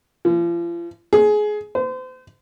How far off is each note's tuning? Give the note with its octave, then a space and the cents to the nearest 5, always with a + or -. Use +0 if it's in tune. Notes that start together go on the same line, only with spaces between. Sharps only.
F3 -40
G#4 +20
C5 -35